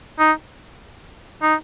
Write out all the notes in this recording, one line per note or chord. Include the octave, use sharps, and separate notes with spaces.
D#4
D#4